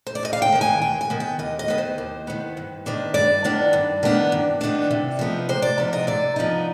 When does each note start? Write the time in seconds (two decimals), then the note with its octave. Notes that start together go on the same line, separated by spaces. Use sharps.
0.07 C5
0.15 D5
0.23 D#2 D#5
0.33 F5
0.42 G5
0.52 D#3 B3
0.61 G#5
0.82 D#2 G5
1.01 G#5
1.10 D#3 B3
1.20 G5
1.39 D#2 D#5
1.59 D#5
1.68 D#3 B3 B4
1.78 C5
1.98 D#2
2.27 D#3 B3
2.57 G2
2.86 D#3 B3 D4
3.14 G2 D5
3.44 D#3 B3 D4
3.73 G2
4.03 D#3 B3 D4
4.32 G2
4.61 D#3 B3 D4
4.91 C3
5.19 F3 B3 D#4
5.49 C3 C5
5.62 D5
5.78 F3 B3 D#4
5.93 D#5
6.07 C3 D5
6.36 F3 B3 D#4